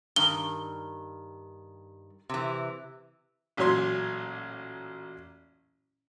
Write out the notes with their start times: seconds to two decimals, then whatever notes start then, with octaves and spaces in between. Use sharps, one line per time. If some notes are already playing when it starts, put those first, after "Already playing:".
0.16 G2 D#3 G7
2.29 C3 E3
3.57 A1 A#2 F#3 C#5 C6